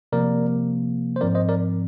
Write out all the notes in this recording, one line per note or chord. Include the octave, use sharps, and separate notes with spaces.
C3 F3 A#3 A#4 D5
C5
G#2 F3 C4 A#4 D5
C5 D#5
A#4 D5